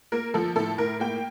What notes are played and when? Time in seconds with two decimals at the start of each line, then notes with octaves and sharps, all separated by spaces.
0.12 A#3 A#4
0.34 F3 A4
0.56 A2 A4
0.78 A2 A#4
1.00 A#3 G5